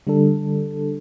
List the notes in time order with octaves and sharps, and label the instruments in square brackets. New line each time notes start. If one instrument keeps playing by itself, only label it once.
[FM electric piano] D3 G3 D4 A4